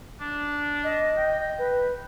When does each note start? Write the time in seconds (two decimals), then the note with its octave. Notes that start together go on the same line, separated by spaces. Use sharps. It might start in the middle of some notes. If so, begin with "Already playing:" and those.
0.20 D4
0.84 D#5
1.17 G5
1.58 B4